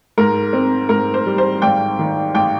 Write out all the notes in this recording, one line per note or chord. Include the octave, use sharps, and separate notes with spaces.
G#2 A#4
C4
G#2 A#4
C5
G3
C5
G#1 G5
D#3
G#1 G5